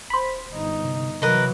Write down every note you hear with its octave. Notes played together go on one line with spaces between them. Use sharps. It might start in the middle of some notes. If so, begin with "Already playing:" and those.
D#1 C5 B5
G1 D#4
C3
C3 E3 F#3 A#4 B4 D#5